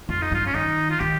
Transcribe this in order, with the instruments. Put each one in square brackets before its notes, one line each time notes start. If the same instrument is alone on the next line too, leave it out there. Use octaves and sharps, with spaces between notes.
[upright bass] F2 [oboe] F4
[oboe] D#4
[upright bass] G2 [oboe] F4
[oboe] C#4
[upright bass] D#3 [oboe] D#4
[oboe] F4
[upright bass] D#3 [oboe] G4